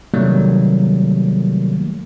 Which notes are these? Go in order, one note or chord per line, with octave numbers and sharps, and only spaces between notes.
C3 D#3 F#3 G3 A3 A#3